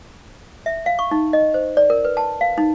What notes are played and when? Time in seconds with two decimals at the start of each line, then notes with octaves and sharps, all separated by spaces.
0.66 E5
0.86 F5
0.99 C#6
1.11 D#4
1.33 D#5
1.54 C5
1.77 D5
1.90 A#4
2.05 B4
2.17 A5
2.41 F5
2.58 D#4